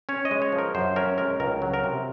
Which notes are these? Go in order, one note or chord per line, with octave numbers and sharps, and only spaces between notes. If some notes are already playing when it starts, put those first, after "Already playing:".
C#4 C#5
D#5
G#3
C#5
F3
A#4
F#2 C5
C#4 A#4
G#3 A#4
C#2 A#4
F#3
A#4
C3